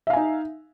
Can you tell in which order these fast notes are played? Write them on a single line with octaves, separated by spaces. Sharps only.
E5 F5 G#5 D#4